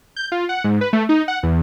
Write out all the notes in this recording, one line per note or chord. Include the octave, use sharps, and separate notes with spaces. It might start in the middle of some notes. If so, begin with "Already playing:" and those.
G6
F4
F#5
G#2
B4
A3
D#4
F#5
E2